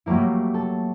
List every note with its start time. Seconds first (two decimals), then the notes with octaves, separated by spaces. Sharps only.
0.06 F#3 G3 A3 A#3 E4
0.54 A4